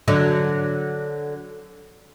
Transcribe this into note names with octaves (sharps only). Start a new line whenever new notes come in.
D3 F#3